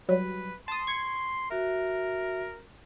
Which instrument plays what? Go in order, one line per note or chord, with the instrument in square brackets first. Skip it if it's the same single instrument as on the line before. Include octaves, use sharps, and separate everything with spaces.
[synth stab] F#3 G3 [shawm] B4
[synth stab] A5 D#6 [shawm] C6
[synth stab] C#6 G#6
[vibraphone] F#4 E5 [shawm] A#4